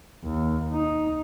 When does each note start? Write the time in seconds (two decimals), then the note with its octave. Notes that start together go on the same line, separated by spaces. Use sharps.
0.24 D#2
0.72 D#4